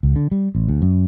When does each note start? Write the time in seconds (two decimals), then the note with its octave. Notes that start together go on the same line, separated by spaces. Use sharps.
0.03 C#2
0.16 D3
0.31 G3
0.55 A1
0.68 D2
0.82 F#2